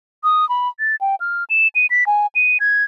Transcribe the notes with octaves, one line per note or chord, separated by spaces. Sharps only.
D#6
B5
A6
G5
F6
E7
D#7
B6
G#5
D#7
G#6